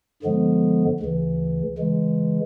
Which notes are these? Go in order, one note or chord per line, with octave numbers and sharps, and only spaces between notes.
G2 D3 F3 G#3 B3
D2 C#3 E3
C#3 E3 G#3